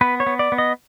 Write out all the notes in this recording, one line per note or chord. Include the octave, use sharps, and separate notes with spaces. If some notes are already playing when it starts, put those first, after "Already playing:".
B3 B4
C#5
B3
D5
B3
D#5